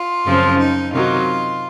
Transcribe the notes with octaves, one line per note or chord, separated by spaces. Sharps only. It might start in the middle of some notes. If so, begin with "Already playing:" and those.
Already playing: F4
F#2 C#3 F3 C4
D#4
C3 D#3 F#3 F4